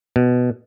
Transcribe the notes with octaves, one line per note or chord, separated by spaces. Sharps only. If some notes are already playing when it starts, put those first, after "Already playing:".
B2